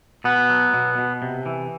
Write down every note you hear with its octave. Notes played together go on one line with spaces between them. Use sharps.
B2 B3
F#3
B2
B2
C3
E3